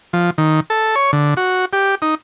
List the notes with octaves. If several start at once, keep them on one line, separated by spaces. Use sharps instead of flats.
F3
D#3
A4
C#5
D3
F#4
G4
D#4